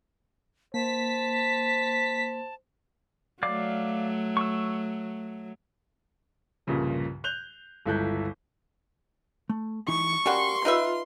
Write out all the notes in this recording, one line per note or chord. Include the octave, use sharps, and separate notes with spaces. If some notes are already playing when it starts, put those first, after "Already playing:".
A#3 C5 A5 B6
F#3 A3 D5 F5 D6
C#6 E6
C2 G2 A#2 C#3 F3
F#6 G6 F7 G7
G1 C#2 E4 A4 F#6 G6
A3
E3 D#4 E4 C#6 C#7
G3 C#4 F#4 G4 A#4 F5 C6
D#4 F4 B4 E5